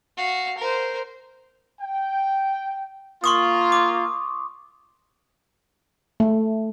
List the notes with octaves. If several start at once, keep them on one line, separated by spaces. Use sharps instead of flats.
F#4 F5
A#4 C5
G5
A#3 F4 C6 C#6 D#6
D6
A3